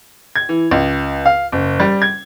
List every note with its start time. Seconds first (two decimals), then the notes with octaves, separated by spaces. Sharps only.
0.36 G#6
0.49 E3
0.71 C#2
1.26 F5
1.52 F#1
1.80 G3
2.02 G#6